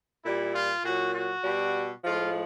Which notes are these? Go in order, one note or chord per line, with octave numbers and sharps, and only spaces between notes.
A#2 G3 E4
F4
A#2 F#3 F#4
F#4
B2 G3
A2 F3 G#3 F4